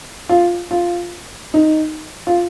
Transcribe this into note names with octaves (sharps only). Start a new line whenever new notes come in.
F4
F4
D#4
F4